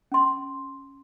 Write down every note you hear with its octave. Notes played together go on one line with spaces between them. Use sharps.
C#4 C6